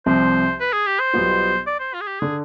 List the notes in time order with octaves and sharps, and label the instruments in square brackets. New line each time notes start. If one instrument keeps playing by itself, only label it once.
[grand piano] C2 C3 F3 C4 [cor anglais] C5
[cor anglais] B4
G#4
G4
C5
[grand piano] B1 B2 G3 B3 F4
[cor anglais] D5
C5
F4
G#4
G4
[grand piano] D3 [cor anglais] G#4